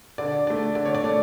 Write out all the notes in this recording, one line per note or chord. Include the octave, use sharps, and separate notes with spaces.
D3 D5
A3 D4 D5
D3 D5
C#5
D5
A3 D4